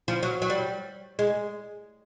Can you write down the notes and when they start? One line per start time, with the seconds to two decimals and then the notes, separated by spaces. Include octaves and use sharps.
0.08 F3
0.23 F#3
0.42 F#3
0.50 G3
1.19 G#3